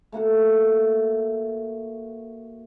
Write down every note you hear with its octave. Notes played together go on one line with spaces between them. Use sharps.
A3 A#3 F#4 A4